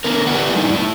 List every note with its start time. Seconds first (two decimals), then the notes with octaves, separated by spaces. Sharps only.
0.04 D3 B3 A#4
0.27 B3 E4 G4 B4 D5 F#5
0.55 G3 D4 D#4
0.69 A2 E4